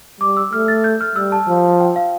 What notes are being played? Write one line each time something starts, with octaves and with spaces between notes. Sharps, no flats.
G3 D6
E6
A3 F6
A6
G6
F6
G3 E6
A5
F3
G5
F5